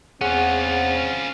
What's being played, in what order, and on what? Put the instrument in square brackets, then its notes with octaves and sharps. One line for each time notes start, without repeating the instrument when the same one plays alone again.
[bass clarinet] E2 [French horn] C4 [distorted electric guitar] C#4 F4 [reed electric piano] G#4 F#5